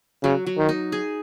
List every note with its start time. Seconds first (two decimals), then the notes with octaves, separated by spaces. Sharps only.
0.23 C#3 F#3
0.47 F#3
0.58 D#3
0.69 D#4
0.92 G#4